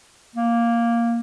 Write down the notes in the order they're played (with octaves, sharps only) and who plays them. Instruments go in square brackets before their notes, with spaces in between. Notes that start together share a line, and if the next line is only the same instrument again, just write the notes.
[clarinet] A#3